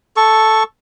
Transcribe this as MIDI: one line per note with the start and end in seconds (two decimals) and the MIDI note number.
0.17 0.63 69
0.17 0.63 85